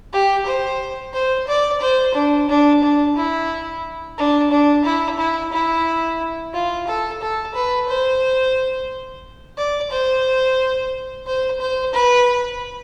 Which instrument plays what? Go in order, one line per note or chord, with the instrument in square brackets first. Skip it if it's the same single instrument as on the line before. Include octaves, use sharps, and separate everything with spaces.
[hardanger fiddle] G4
C5
C5
D5
C5
D4
D4
D4
E4
D4
D4
E4
E4
E4
F4
A4
A4
B4
C5
D5
C5
C5
C5
B4